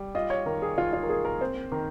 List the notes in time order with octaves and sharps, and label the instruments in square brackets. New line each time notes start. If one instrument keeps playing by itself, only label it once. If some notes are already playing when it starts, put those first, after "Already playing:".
Already playing: [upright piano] G3
[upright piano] F4 [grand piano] D#5
[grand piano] C#5
[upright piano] D#3 [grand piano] A#4
[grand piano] G#4
[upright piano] D#3 [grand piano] F4
[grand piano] F4
A#4
[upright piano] A#3 [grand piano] G#4
[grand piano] A#4
[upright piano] C4 [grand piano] C5
[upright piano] D#3 [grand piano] A#4